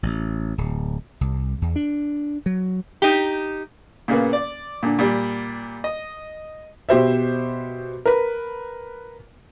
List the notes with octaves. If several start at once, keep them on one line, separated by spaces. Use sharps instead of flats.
A1
D1
C2
E2
D4
F#3
D#4 G4
A#2 C#3 A#3 B3
D5
A#2 D3
A#2 G3
D#5
B2 G4 C5 E5
A#4 B4